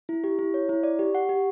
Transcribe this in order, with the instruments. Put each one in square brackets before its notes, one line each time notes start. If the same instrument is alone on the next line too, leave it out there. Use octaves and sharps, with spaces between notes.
[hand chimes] E4
G4
E4
C#5
E4
D5
G4
F#5
G4